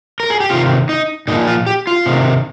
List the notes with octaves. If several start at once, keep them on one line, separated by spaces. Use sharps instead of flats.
A#4
G#4
G4
C3 D#3 F4
D#4
A#2 F3 D#4
F4
G4
F4
C3 D#3